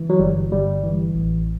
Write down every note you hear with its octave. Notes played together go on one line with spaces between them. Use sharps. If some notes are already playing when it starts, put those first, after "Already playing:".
Already playing: E3
F#3
G1 G3
G1 G3
E3
A1